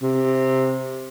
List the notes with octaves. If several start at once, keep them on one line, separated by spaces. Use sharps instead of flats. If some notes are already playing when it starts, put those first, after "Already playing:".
C3